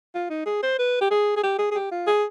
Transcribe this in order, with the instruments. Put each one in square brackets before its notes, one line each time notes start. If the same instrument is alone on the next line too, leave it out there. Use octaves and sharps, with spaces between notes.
[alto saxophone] F4
D#4
G#4
C5
B4
G4
G#4
G#4
G4
G#4
G#4
G4
F4
G#4